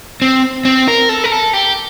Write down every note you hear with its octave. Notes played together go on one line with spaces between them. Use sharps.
C4
C4
A#4
A4
A#4
A4
G4